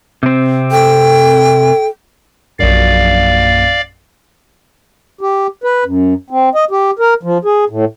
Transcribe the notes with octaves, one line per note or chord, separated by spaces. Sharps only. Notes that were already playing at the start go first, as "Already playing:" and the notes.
C3 C4
A4 G5
A#1 F#2 D5 F5
G4
B4
F#2
C4
D#5
G4
A#4
F3
G#4
A2